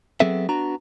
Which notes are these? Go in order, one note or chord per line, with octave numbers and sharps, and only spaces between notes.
F#3 B3 C4 G#4 A4 E5
B3 D4 F#4 A#5